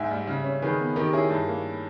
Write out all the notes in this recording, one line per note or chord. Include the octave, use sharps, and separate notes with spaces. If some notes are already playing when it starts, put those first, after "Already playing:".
Already playing: G#2 E5 G#5
G3
C#3
C#4
D#3 G#4 B4
B3
D#3 G4 A#4
C#4 E4 G#4
G2
A#3